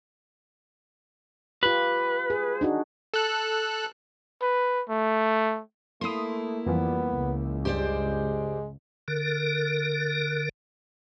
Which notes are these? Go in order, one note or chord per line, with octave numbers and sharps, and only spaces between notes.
F4 G4 B4
G#4
D4 D#4 F#4
A4 F#6
B4
A3
A3 A#3 E4 C6 D#6
F2 E3 F3 G3 B3
C#2
G2 G#3 G4 C5 D5
D3 A#4